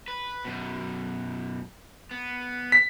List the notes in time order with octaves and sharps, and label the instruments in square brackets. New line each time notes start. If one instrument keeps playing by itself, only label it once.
[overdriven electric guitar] B4
F#2 B2
B3
[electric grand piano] B6